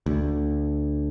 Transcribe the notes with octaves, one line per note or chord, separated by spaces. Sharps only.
D2